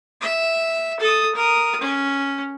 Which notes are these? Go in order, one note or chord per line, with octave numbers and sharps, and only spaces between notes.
E5
A4 D#6
A#4 D#6
C#4